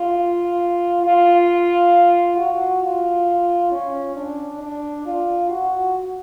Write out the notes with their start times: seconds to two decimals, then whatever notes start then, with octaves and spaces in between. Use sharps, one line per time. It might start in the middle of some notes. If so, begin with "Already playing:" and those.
Already playing: F4
1.03 F4
2.37 F#4
2.82 F4
3.72 C#4
4.16 D4
4.61 D4
5.06 F4
5.50 F#4